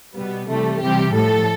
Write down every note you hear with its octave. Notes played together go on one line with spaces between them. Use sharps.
B2 G3 B3
C3 E3 G3 A3
C3 E3 G3 G4
A2 F3 A4